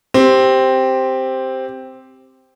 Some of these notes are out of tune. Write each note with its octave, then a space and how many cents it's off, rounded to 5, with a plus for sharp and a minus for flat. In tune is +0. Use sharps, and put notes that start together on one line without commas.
C4 +0 G4 +0